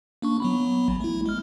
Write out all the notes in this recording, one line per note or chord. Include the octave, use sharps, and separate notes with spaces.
A#3 D4 C#6
F#3 B3 B5
A1
A3 E4
G#3 F6